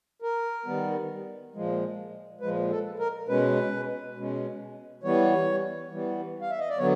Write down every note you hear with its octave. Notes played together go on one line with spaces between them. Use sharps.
A#4
D#3 G3 B3
A#2 F3 G#3
A#2 F3 G#3 B4
A4
A#4
B2 G#3 C#4 B4
B2 G#3 C#4
E3 G3 B3 C#5
E3 G3 B3
F5
E5
D#5
D5
D3 F#3 B3 C#5